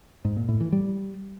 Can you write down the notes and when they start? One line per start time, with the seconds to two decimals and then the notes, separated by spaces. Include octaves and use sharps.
0.25 G#2
0.37 A#2
0.49 A2
0.61 E3
0.72 G3